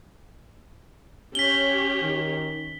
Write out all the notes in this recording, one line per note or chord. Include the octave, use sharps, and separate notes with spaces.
C#4 G4 C#5 B6 F#7 G7
D#3